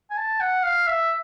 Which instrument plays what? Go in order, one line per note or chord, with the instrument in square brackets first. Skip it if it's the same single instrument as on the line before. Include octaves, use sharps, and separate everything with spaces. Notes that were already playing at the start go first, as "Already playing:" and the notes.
[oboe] G#5
A5
F#5
F5
E5